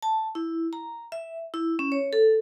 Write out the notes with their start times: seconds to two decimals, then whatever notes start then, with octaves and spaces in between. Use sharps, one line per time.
0.03 A5
0.35 E4
0.73 A#5
1.12 E5
1.54 E4
1.79 C#4
1.92 C#5
2.13 A4